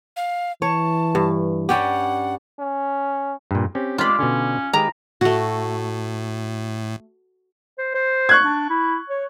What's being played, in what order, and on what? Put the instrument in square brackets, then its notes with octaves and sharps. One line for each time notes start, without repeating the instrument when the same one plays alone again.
[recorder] F5
[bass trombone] E3 [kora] C#5 [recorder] A5
[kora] G2
[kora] G3 C#4 G4 [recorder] F#5
[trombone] C#4
[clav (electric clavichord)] G2 A#2
[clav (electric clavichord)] C4 C#4 [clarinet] G4
[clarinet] G#3 [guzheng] F4 B5 [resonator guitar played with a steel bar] G4 D5
[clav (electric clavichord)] B2 D3 [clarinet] C#4
[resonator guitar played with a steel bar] D#3 B4 [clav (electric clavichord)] G#3 G4 [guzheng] A#5
[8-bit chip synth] A2 [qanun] A3 F#4
[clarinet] C5
C5
[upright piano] C#6 F#6 G#6
[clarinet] D4
E4
C#5